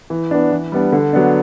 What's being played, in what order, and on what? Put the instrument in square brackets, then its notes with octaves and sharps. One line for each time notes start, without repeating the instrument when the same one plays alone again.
[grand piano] E3
B3 D4
E3
G3 B3 D4
D3
F#3 B3 D4